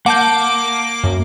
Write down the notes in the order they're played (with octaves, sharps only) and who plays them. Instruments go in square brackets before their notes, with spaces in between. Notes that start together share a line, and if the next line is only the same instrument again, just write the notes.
[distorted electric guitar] A#3 [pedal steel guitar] F#5 A5 G6 [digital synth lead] D6
[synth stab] F#2